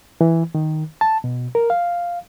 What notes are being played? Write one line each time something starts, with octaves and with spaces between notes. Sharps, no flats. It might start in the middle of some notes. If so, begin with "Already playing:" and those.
E3
D#3
A5
B2
A#4
F5